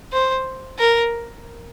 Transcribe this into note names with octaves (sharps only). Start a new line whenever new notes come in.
C5
A#4